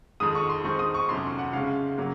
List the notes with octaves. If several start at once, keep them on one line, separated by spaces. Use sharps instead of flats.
F2 D#3 G#3 D#6
C#6
C6
D#3 G#3 C4 D#4 C#6
D#6
C#6
F2 C3 F#3 C#4 C6
F#5
C#3 G#3 C#4 F5
C#3 F#3 A#3